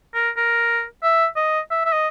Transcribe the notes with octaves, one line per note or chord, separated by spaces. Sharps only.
A#4
A#4
E5
D#5
E5
E5
D#5